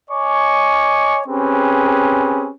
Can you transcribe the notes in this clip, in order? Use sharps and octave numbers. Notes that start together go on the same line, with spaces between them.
C#5 D#5 G#5 C#6 D6
C4 C#4 G4 G#4 B4